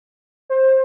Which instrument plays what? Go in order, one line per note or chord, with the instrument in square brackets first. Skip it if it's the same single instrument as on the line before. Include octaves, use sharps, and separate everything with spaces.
[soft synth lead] C5